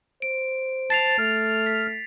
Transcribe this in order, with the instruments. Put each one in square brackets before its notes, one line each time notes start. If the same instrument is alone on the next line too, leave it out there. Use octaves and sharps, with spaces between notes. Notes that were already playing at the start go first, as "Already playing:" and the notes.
[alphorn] C5 [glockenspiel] D7
[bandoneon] A5 [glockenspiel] A6 C7 F7
[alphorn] A3 [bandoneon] F6
[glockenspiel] B6